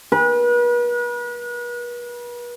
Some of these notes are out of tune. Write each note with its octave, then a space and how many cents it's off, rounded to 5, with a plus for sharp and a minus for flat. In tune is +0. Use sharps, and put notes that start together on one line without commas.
B4 -40